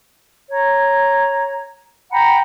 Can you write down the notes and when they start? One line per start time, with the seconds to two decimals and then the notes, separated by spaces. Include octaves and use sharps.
0.49 C#5 A#5
2.11 F#5 G5 A#5 B5